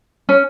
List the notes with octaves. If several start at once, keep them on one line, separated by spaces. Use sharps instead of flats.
C#4